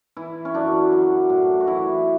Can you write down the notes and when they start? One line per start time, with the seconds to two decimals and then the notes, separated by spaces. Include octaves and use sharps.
0.17 E3 E4
0.45 C#4
0.54 F#2 D4
0.92 F#3
1.29 A2
1.60 F#4
1.67 E3 E4